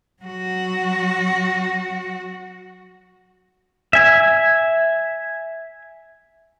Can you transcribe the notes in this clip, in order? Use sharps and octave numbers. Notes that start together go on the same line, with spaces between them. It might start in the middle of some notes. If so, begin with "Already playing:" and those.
F#3 F#4
E5 G#5